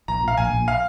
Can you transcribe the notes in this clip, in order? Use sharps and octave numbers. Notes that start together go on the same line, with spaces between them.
A#1 A#5
A#2 F5
A#1 G#5
A#1
F5